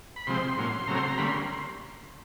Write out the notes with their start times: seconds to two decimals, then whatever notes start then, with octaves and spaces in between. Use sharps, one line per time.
0.16 B5
0.27 C3 F3 G#3 C4 C6
0.57 A2 F#3 A#3 C#4
0.87 C#3 F#3 A3 C4 A#5
0.98 C6
1.08 A#5
1.18 D3 G3 A#3 C#4 B5
1.28 C6